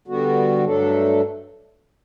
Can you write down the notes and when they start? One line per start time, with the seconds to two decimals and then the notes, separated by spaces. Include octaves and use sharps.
0.08 D3 G3 B3 F#4
0.64 G2 F#3 A3 D4 A4